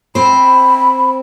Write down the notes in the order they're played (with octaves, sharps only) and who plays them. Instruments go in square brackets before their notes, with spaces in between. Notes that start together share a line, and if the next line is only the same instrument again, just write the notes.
[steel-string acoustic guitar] C4 C5 [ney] B5